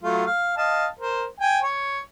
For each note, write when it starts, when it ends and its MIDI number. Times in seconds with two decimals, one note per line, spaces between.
0.03 0.25 54
0.03 0.25 57
0.03 0.25 65
0.26 0.57 77
0.57 0.86 75
0.57 0.86 77
0.57 0.86 81
0.99 1.26 70
0.99 1.26 72
1.40 1.59 79
1.40 1.59 80
1.63 2.00 73